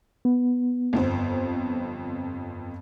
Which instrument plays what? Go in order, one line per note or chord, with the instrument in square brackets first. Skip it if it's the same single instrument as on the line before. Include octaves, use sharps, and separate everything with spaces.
[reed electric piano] B3
[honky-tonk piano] G1 F2 C5